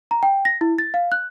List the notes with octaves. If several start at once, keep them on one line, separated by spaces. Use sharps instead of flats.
A#5
G5
A#6
E4
A6
F5
F#6